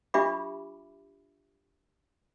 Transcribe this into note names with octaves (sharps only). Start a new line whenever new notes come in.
D4 F4 G4 E5 B5 D6